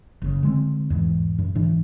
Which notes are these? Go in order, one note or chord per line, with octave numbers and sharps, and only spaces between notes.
F#1 C#3
D3 G#3 B3 C4
E2 G#2 E3
F#2
G#2 E3 D4